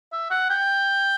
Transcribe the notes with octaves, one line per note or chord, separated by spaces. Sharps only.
E5
F#5
G5